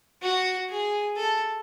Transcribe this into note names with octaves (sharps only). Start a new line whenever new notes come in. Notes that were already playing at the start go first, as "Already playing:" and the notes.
F#4
G#4
A4